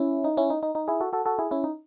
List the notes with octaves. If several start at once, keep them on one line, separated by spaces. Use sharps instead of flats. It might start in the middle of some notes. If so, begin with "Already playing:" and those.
Already playing: C#4 E4
D#4
C#4 E4
D#4
D#4
D#4
E4 G#4
F#4 A4
F#4 A4
F#4 A4
E4 G#4
C#4 E4
D#4